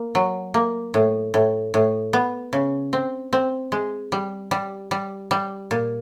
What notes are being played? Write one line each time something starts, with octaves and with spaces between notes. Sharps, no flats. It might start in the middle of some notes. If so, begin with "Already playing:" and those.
Already playing: A#3
F#3
A#3
A2
A2
A2
B3
C#3
C4
C4
G#3
G3
G3
G3
G3
A#2